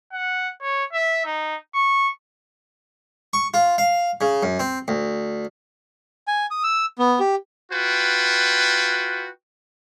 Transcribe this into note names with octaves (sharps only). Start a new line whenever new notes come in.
F#5
C#5
E5
D#4
C#6
C#6
F4
F5
C#3
F#2
C4
D2
G#5
D#6
E6
B3
G4
F4 F#4 B4 G5